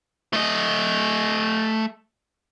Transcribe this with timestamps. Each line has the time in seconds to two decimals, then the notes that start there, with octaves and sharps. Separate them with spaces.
0.33 A3 D#5